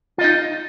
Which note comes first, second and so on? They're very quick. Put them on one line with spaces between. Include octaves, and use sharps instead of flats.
F4 D#5 D#4